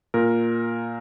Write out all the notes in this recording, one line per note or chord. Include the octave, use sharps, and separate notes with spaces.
A#2 A#4